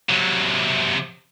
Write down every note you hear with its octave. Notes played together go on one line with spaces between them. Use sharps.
C3 F#3